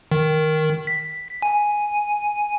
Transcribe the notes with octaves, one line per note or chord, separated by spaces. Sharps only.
D#3
B6
G#5